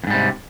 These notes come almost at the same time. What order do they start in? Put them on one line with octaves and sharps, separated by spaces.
F2 G#2 G3 C3